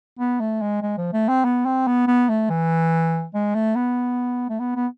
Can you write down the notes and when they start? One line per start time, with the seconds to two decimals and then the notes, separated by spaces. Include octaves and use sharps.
0.19 B3
0.40 A3
0.61 G#3
0.82 G#3
0.98 F3
1.13 A3
1.29 C4
1.45 B3
1.66 C4
1.87 B3
2.07 B3
2.29 A3
2.50 E3
3.34 G#3
3.55 A3
3.76 B3
4.49 A3
4.60 B3
4.76 B3